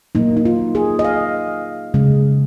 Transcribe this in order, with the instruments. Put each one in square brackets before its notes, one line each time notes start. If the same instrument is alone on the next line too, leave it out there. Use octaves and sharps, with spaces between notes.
[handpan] A#2 F#3 A#3 D#4
D#4
F4
G#4
D#5
F5
C#3 G#3